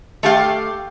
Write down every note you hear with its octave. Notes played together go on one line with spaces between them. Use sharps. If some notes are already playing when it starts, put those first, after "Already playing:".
A3 G4 F5